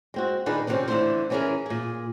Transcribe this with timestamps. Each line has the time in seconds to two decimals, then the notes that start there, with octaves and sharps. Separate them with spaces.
0.14 G#3 C4 F#4
0.46 A#2 D#3 D4 D#4 G#4 B4
0.67 C3 D#3 G3 A#3 C4 C#4
0.88 D3 E3 A3 A#3 D4 C5
1.30 E3 B3 C#4 E4 G#4 A#4
1.66 A#2 G#4